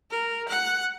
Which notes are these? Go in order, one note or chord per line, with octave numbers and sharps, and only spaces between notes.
A#4
F#5